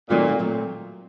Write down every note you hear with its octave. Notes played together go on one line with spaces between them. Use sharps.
A#2 D#3 F#3 A3 C4
A#2 F#3 A3 C4